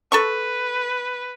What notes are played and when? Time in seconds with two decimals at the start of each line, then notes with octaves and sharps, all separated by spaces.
0.12 A4 B4 A5 C#6